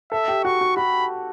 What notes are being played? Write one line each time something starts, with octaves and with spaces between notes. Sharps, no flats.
A4 E5
G4
F#4 C#6
F#4
F#4 B5